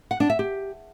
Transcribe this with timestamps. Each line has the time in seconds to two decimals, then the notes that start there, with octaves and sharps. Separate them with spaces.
0.11 F#5
0.20 D4
0.30 E5
0.39 G4